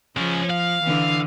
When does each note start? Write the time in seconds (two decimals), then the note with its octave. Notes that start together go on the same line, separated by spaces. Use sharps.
0.17 F3 G#3 C#4
0.50 F5
0.84 D3 E3